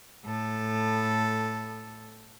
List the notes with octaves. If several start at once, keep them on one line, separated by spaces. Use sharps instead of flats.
A2 A4